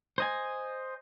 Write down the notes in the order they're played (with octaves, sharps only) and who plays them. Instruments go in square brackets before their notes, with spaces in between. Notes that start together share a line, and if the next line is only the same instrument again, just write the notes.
[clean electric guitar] C5 D#5 G#5